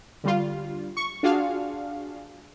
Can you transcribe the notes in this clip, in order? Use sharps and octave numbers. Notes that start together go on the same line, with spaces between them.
D3 G3 F4
C#6
D4 F4 F#4 G#4 F5